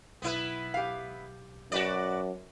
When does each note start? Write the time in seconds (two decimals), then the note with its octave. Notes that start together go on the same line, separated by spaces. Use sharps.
0.22 B1 B3 E4 B4
0.74 G4 F5
1.72 F#2 F#4 B4 D5